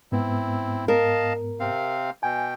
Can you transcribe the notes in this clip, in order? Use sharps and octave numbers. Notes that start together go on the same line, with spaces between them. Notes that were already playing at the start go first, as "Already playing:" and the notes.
G#2 B3 C4 E4
A#4 D#5 F5 A5
C3 C4 F5
B2 G5 G#5